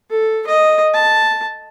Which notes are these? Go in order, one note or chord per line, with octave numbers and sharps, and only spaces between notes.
A4
D#5
A5